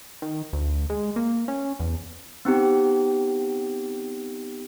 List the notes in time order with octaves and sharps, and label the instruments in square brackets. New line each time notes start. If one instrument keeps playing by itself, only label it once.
[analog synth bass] D#3
D2
G#3
A#3
C#4
E2
[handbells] B3 C4 D#4 G4